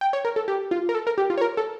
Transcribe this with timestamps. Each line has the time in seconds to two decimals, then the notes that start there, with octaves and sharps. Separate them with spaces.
0.01 G5
0.13 C#5
0.25 A#4
0.36 A4
0.48 G4
0.71 F4
0.89 A#4
0.95 A4
1.07 A#4
1.18 G4
1.30 F4
1.38 C#5
1.41 A#4
1.57 A4